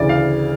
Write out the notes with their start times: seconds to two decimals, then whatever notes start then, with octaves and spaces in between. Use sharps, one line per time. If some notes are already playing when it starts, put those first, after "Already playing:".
Already playing: D2 C#3 E3 D5
0.09 F5